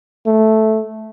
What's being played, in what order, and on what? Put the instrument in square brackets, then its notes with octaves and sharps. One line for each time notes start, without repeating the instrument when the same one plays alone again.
[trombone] A3